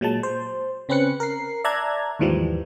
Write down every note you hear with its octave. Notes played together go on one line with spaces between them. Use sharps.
A#2 F#3 G#3 A5
C5
C#3 C4 C#4 B4 F#6 C#7
A#4 C7
D5 E5 A5 A#5 F#6 G#6
D#2 G#2 E3 F3 G3